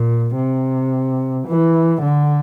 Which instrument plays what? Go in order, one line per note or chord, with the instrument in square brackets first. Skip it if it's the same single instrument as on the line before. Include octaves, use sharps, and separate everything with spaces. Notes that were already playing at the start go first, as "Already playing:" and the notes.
Already playing: [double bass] A#2
C3
E3
D3